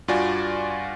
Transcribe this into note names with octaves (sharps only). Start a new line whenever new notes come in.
G2 F4 F#4 D5 G#5